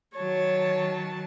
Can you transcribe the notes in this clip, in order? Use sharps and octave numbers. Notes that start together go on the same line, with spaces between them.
D#3 F#3 C#5 A5